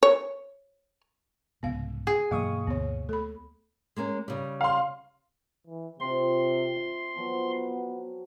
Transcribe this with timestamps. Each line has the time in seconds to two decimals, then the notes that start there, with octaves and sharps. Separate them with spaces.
0.03 C#5
1.63 C2 G#2 C#3 B3 F5
2.07 G#4
2.31 G2 B2 E3 F#3 A#3 F5 C#6 D#6
2.67 D2 B3 C#5
3.09 A3 A4 B5
3.96 G#3 A#3 C#4
4.28 C#3 G3
4.61 F5 C6
5.67 E3
6.00 C3 C4 F4 C6
6.76 E5
7.16 F3 F#3 B3